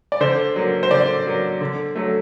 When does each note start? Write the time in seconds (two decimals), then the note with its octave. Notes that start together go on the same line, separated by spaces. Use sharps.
0.12 D5
0.21 D3 C5
0.56 F#3 A#3
0.83 C5
0.91 D3 D5
1.26 F#3 A#3
1.61 D3
1.95 F#3 A3